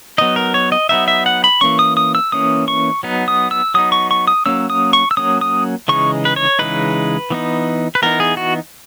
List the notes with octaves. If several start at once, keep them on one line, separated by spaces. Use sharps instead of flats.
F#3 B3 D#4 D#5
A#4
C#5
D#5
F#3 B3 D#4 E5
E5
F#5
B5
E3 A#3 C#4 C#6
D#6
D#6
E6
E3 A#3 C#4 D#6
C#6
F#3 B3 D#4
D#6
E6
F#3 B3 D#4 D#6
C#6
C#6
D#6
F#3 A#3 C#4 E6
D#6
C#6
E6
F#3 A#3 C#4 D#6
D#6
C#3 E3 G#3 D#4 C#6
B4
C#5
C#3 E3 G#3 D#4 B4
E3 B3 D#4
B4
E3 B3 D#4 A#4
G#4
F#4